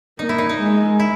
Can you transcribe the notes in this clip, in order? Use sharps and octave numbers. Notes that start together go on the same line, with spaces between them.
A#3 D#4
E4
D#4
D#4
G#3
E4